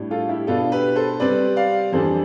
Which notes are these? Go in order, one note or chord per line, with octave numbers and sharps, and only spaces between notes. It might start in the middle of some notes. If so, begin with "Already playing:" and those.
Already playing: A2 G3 D4
F4 A4
E4 G4
B2 B3 D4 F4 A4
G4 B4
A4 C5
C3 G3 C4 B4 D5
D5 F5
F2 C3 E3 G3 D4 A4 C5